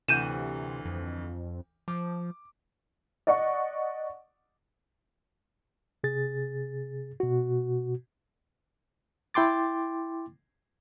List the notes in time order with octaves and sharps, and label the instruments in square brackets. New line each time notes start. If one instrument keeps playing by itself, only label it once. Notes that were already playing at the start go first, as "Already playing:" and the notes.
[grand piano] D2 E3 F#5 [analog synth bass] C3 [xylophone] G6 D#7 E7
[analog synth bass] F2
[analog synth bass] F3 [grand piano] D6
[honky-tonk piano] D5 D#5 F#5 C#6
[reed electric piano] C3 G#4 A6
B2 F#4
E4 G5 C6 D6 A6